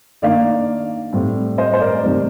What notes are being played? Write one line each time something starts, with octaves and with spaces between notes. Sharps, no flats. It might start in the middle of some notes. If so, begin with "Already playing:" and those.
D#3 A#3 D4 D5 F5
A2 G3 C4
C5 D#5
C5
A#4 D5
C3 D#3 G3